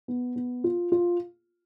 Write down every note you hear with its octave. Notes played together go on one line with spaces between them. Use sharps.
B3
B3
F4
F4